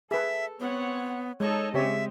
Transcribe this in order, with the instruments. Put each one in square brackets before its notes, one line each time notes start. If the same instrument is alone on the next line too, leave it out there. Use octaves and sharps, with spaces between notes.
[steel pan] G#4 B4 [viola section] A4 [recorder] E5
[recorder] B3 [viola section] C4 C#5 F#5
[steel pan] G#3 [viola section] D#4 A4 D#5 [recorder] C#5
[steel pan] C#3 G4 C#5 [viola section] G#3 C4 [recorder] E5